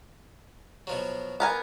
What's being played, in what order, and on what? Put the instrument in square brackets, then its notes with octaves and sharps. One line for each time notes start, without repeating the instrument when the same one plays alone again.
[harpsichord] B2 F3 F#3
[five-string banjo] B3 A#4 G#5 [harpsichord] D6